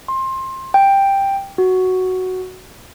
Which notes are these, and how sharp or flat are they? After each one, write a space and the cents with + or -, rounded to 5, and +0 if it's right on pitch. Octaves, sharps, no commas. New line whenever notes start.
C6 +20
G5 +5
F#4 +5